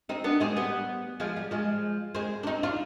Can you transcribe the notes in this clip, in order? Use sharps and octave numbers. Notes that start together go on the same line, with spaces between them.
C4 D#4
B3 D4
G#3 C4
G3 B3
F3 G#3
G3
F3 G#3
G#3 C4
D4
C4 D#4
D4 F4